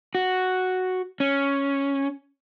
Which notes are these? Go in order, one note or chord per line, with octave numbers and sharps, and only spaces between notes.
F#4
C#4